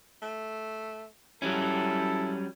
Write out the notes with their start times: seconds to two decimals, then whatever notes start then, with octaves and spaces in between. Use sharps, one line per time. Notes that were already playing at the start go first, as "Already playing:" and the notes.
0.22 A3
1.42 F#3 G3 C#4 E4 A4